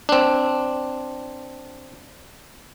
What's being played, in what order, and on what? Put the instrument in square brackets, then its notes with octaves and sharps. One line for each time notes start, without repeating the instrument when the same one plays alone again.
[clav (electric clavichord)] C4 D4